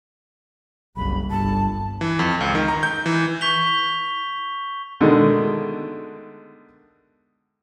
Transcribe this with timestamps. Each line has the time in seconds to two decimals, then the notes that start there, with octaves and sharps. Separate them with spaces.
0.96 F#1 C2 B5
1.31 G1 A5
2.01 E3
2.19 F2
2.41 C#2
2.55 D#3
2.68 A#5
2.83 G6
3.06 E3
3.41 C#6 G6 B6 F7 G7
5.01 B2 D3 D#3 G#3 A3